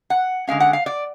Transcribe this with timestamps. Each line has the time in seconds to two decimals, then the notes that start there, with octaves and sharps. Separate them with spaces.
0.10 F#5
0.47 D3 G#3 C#4 F5
0.60 F#5
0.73 F5
0.86 D5